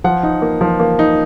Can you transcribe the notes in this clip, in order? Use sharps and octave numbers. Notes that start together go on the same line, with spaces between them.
F3 F#5
D#4
A#3
F3
A#3
D#4